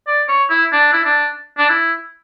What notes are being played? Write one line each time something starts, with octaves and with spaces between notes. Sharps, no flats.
D5
C#5
E4
D4
E4
D4
D4
E4